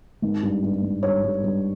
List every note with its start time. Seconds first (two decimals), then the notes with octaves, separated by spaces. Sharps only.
0.22 G#1
0.43 G2
0.63 G2
0.82 G#1
1.03 G2 C#5
1.24 G2
1.44 G2